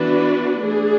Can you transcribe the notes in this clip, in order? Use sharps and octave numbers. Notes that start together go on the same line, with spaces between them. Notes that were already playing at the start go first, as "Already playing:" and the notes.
Already playing: E3 B3 D4 F#4 B4
A3 D4 G#4